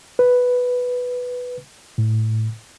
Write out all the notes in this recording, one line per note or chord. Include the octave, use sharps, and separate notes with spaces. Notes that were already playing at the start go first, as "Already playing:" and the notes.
B4
A2